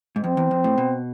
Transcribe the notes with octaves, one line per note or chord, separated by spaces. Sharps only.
G#2
F2 C4
E2
F2
A2
B2